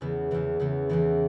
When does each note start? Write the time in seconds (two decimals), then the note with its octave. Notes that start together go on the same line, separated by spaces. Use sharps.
0.01 E2 C#3 E3 B3
0.31 E2 C#3 E3 B3
0.59 E2 C#3 E3 B3
0.89 E2 C#3 E3 B3